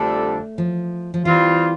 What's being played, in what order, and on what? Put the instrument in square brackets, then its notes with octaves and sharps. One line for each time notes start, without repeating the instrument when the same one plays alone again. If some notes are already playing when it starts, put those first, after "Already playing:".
Already playing: [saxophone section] F2 D3 G3 D4 A4 [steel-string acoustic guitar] A3
[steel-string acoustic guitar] F3
F3
[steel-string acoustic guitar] E3 [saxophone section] G3 C4 F4